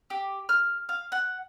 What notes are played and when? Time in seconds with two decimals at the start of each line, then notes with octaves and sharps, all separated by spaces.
0.10 G4
0.49 F6
0.89 F5
1.12 F#5